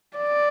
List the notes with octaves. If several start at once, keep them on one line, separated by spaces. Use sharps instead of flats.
D5